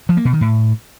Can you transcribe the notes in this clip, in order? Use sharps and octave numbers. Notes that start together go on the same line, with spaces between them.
F3
A#3
B2
D#3
A2